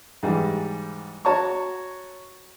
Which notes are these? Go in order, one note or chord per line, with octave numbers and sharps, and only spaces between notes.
G#2 E3 G3
F#4 C#5 A5 A#5 C#6